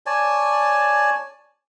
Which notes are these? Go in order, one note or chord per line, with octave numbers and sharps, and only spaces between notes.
C#5 D5 G#5 A5